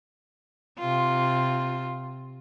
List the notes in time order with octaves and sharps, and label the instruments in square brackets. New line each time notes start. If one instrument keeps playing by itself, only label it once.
[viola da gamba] C3 F4